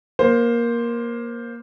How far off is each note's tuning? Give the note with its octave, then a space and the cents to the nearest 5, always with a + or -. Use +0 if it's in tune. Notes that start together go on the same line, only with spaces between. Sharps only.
A#3 +15 C5 +5